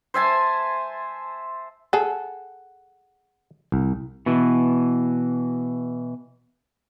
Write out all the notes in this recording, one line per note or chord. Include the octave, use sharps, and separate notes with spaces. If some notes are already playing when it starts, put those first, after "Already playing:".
C5 E5 G#5 A5
G#4 A4 F#5
C2
B2 E3